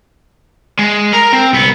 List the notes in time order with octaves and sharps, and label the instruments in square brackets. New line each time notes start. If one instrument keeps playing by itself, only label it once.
[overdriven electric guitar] G#3
A#4 A#5
C4
C2 B3